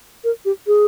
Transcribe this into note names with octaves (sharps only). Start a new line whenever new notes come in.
A#4
G4
G#4